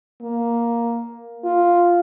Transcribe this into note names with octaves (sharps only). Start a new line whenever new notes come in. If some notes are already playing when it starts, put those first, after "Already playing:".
A#3
F4